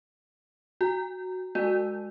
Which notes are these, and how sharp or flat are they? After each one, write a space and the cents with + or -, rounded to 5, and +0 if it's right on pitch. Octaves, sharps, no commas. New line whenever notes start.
F#4 +0 A#5 -10
G#3 +0 F#4 +0 D5 +35